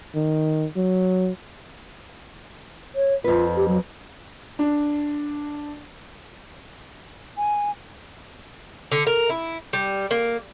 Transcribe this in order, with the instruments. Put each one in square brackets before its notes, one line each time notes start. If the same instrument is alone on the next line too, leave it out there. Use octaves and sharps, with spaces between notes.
[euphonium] D#3
F#3
[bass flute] C#5
[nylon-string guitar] F2 B4 [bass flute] F4
[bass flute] G4
F#3
[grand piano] D4
[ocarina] G#5
[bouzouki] D3
A#4
E4
G3
A#3